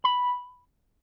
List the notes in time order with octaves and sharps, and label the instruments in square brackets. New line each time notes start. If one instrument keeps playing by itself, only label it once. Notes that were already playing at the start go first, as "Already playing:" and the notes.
[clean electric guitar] B5